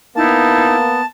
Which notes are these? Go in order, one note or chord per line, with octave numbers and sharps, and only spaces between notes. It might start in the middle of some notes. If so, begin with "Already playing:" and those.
A#3 B3 D#4 E4 A5